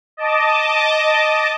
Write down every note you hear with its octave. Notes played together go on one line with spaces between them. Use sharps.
D#5 A5 D6